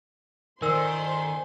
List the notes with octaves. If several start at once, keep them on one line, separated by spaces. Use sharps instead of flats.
D#3 A4 A#4 C5 D5 G#5 C6 E6